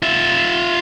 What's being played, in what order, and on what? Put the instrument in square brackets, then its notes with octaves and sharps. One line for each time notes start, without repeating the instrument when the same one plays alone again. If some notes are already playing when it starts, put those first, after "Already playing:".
[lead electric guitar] F4 E5